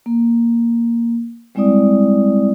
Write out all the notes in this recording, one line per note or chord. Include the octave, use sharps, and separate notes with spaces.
A#3
G3 G#3 C4 E4 D5 D#6